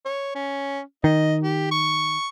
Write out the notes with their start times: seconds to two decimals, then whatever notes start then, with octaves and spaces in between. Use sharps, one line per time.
0.05 C#5
0.35 C#4
1.04 D#3 D#5
1.43 G4
1.71 C#6